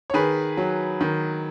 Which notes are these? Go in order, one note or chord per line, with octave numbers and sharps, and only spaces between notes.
C#5
D#3 G#4 B4
F#3
D#3